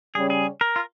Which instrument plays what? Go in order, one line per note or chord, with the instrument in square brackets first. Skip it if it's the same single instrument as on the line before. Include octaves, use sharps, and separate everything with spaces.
[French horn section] C#3 G3 C#4 [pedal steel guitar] G#4
[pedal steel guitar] G#4
A#4
F4